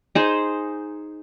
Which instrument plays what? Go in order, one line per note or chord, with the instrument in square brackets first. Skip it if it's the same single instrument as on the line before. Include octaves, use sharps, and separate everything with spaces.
[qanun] D#4 G#4 C5